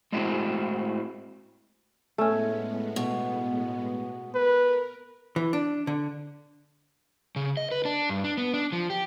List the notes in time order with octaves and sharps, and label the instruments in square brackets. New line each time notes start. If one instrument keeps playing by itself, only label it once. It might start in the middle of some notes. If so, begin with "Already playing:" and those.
[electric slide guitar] A2 G#3 C4 E4 F#4
[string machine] A2 G#3 B3 [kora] A3 C#4
[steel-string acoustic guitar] B2
[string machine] A#4 [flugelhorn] B4
[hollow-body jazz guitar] E3
D4
D3
[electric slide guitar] C#3
D#5
B4
D4
G2
D4
B3
D4
F3
G4